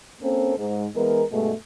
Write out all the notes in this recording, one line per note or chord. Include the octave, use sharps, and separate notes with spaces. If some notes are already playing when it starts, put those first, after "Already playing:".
A#3 C4 C#4 A4 A#4 C5
G#2
E3 G#3 B3 A#4
G2 B2 G#3 A3